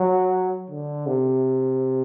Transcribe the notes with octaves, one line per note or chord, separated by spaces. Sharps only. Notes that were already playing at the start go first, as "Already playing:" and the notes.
Already playing: F#3
D3
C3